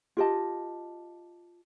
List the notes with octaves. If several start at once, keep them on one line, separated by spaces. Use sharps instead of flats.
F4 G4 D#5 A5